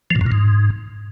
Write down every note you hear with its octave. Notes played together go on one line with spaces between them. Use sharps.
F3
A#2
F#2
A#2
G#2